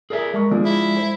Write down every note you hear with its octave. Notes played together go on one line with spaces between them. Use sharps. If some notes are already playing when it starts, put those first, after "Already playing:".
G#4 A#4 D5 E5
G#3 A4 A#4 C#6
F3 D4 G#4
E4
C5